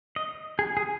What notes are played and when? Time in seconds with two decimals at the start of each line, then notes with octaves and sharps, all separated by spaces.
0.16 D#5
0.59 G#4
0.77 G#4